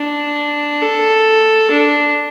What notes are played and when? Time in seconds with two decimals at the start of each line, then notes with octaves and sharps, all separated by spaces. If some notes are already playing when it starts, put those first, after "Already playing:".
Already playing: D4
0.81 A4
1.70 D4